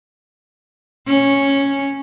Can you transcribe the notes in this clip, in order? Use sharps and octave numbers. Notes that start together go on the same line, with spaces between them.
C#4